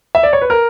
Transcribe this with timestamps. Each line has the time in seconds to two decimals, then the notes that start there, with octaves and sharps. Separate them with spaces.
0.15 E5
0.23 D5
0.33 C#5
0.42 B4
0.50 A#4